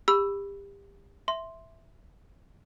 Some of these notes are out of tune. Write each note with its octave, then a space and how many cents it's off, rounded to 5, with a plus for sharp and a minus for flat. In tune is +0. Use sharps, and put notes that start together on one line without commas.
G4 +30 B5 +0 E6 +10
E5 +0 C6 +0